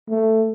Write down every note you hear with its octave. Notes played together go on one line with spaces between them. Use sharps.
A3